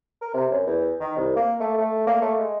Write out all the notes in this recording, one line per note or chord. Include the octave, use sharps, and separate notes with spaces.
A#4
C3
F#2
E2
D#3
C2
A#3
A3
A3
A#3
A3
G#3